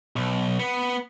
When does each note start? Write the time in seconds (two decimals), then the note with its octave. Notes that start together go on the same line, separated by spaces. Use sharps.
0.16 B1
0.60 B3